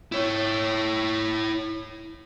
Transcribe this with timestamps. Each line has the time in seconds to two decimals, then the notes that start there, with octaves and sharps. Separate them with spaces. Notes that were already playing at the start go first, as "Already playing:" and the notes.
0.12 E4 C#5